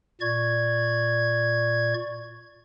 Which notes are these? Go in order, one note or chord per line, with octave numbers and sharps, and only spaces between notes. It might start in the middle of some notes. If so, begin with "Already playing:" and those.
A#2 D5 C#6 G#6